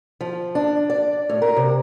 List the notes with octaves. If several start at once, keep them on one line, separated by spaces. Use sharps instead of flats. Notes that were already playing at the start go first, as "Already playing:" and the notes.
F3
D4
D5
A2
A#4
C3